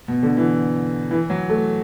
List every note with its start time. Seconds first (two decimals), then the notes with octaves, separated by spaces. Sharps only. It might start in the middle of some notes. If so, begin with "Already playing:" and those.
0.08 B2
0.23 D3
0.37 E3
1.11 E3
1.30 F#3
1.50 A3